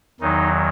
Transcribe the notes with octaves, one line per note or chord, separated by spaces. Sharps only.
E2 D#3 F#3 D#4